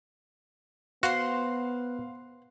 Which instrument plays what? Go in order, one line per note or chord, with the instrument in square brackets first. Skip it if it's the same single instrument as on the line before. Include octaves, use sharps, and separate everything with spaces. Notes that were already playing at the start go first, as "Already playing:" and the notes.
[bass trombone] B3 [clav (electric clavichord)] F#4 [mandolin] C5 F#5 C6 [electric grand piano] F5